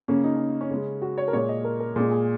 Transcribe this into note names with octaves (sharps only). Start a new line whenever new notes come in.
C#3 A#3 C#4
D#4
C#4
C#4
C#3 G#3
F#4
C#5
A#4
A#2 G#3 C#5
D#5
A#4
A#4
A#2 G#3 G#4
G#4